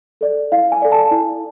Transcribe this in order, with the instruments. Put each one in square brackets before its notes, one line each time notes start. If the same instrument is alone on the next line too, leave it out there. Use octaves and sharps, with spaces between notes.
[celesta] A4 D5
E4 F5
G#5
A4 D5
A5
E4